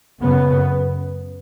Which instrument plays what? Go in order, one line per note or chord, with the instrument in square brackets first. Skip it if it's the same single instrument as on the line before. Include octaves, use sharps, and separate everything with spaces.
[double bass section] F#2 C#3 B3